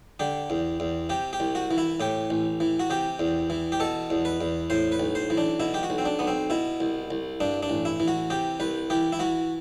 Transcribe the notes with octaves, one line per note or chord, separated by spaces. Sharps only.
D3 G4
E2
E2
C3 G4
G4
C2
F#4
E3
E4
A2 G4
A1
E3
F#4
C3 G4
E2
E3
G4
B2 A4
E2
B4
E2
A2 C5
B4
B1
C5
E3
D4
B2 E4
G4
F#4
B1
C4
D4
B1 B3
C4
B2 E4
C2
C2
G2 D4
D4
A1
E4
E3
F#4
C3 G4
C2 B4
E3 G4
E4
E3 F#4